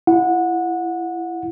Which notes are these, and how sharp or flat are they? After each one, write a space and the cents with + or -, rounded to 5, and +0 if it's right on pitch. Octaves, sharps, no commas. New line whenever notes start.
E4 +25 F#5 -20